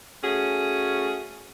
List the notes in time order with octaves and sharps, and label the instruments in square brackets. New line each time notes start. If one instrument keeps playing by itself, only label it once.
[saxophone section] A3 C#4 F#4 G#4